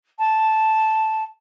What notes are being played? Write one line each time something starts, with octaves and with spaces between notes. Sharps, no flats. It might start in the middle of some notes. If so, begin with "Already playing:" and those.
A5